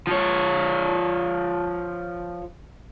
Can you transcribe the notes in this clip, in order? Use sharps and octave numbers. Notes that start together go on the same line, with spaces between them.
F3 C#5